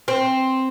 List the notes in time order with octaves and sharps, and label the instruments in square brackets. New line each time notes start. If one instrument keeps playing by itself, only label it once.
[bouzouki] C4